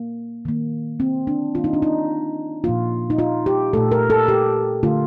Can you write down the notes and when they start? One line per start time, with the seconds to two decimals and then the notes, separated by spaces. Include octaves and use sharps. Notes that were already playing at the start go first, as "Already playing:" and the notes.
Already playing: A#3
0.45 D#3 A#3
1.00 C4
1.27 D4
1.54 D#3 A#3 F4
1.64 D#4
1.73 D4
1.82 D#4
2.64 A#2 F3 A#3 F4
3.10 D#4
3.19 F4
3.46 G4
3.73 A#2 A3 A4
3.92 A#4
4.10 A4
4.28 G4
4.83 D3 A3 F4